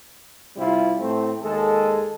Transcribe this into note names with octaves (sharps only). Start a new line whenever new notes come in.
C3 G3 C4 E4 F4
A2 A3 C4
D#2 G#3 G#4 A4